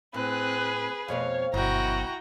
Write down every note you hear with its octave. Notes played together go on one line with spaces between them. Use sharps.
A2 C4 G#4 B4 F#6
F2 B2 A3 C#5 F5
G1 F#2 B2 E4 F#4 G5 A#5